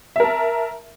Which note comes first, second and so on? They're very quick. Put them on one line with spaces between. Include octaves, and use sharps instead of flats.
E5 A#4 A5